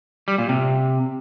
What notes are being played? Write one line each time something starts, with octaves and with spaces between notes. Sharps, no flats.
G3
A#2
C3